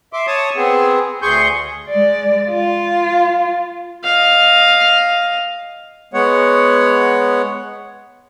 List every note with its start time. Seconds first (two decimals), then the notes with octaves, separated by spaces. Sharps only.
0.13 E5 C6 D6
0.27 C#5 A5 C#6 D#6
0.56 B3 C4 G#4
1.22 D2 G#4 C6 C#6 G6
1.90 G#3 D5
2.50 F4
4.04 D#5 F5
6.14 G#3 B3 C#5 F#5